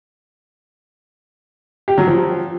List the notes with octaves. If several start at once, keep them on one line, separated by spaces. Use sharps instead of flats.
G4
F#3
F3